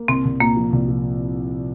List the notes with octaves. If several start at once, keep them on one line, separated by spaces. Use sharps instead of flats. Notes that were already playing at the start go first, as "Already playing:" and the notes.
Already playing: A#3
C2 C4
C2
A#2 A#3
F3
C2
F3